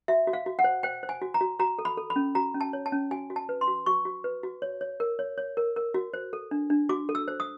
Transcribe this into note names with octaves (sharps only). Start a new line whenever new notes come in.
F#4 E5
F#4
F5
F#4
F#5
C5
C5 G5
C5
G#5
F#4
A#5
F#4
F#4 A#5
A4
B5
A4
B5
C#4
F#4 A#5
C#4
A5
C#5
A5
C#4
F#4 G#5
F#4
A5
B4
C6
F#4
F#4 C#6
F#4
B4
F#4
C#5
C#5
A#4
C#5
C#5
A#4
A#4
F#4
C5
A4
D4
D4
F#4 D6
A4
E6
C5
D#6